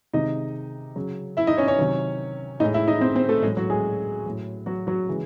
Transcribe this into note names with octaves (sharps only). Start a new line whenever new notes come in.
C3 D#3 G#3 D#4 D#5
C#3 F#3
E4 E5
D#4 D#5
C#4 C#5
C#4 C#5
C3 D#3 F#3
A2 G#3 D#4 D#5
E4 E5
D#4 D#5
C4 C5
C4 C5
A3 A4
A2 F#3 G#3 G#4
F#3 F#4
G#3 G#4
A2 F#3
F#3 F#4
F#3 F#4
C#3 E3 G#3